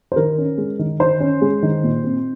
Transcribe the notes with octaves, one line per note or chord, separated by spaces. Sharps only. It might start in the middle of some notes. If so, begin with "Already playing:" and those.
C5
D#3 A#4
C#4
G#3
D#3
D#3 C5
C#4
G#3
D#3
A#2
C4